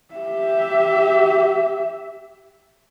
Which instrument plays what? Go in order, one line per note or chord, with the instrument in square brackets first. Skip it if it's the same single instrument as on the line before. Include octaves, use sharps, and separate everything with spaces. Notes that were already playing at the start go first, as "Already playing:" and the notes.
[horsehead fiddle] G4 E5